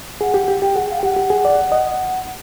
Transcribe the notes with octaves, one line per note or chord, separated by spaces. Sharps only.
G#4 F#5
G4
G4
G4 G5
G#4 F#5
F5
G5
G4 F#5
G4
G#4
D5
D#5